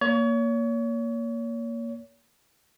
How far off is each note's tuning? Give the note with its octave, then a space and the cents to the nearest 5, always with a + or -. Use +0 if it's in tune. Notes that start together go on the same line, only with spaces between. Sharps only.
A#3 +0 C#5 +35